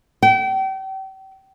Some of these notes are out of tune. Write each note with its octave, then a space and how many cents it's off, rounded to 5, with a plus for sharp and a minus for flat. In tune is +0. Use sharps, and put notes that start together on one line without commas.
G5 -35